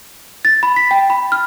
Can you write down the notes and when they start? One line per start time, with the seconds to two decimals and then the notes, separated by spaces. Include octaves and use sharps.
0.45 A6
0.63 B5
0.76 B6
0.91 G5
1.10 B5
1.32 F6